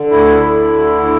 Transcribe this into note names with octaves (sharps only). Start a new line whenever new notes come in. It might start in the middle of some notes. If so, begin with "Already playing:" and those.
Already playing: D3
D2 E4
D3
D2
D3